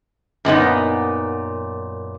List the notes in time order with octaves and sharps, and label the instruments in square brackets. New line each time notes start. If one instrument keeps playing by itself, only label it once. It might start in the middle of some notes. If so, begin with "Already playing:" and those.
[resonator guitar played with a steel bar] F#2 A#2 B3 D#4